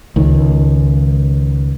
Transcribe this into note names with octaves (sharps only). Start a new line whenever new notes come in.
C#2 D#3